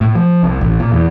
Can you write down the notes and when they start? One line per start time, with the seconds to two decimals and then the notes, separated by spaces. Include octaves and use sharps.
0.01 A2
0.15 F3
0.43 C2
0.61 A1
0.80 A#2
0.92 E2